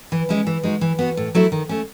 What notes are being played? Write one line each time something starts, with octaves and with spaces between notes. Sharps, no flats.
E3
G#3 C#4 E4
E3
G#3 D#4 F#4
E3
B3 F#4
A2
F#3 A3 E4
D#3
A3 C#4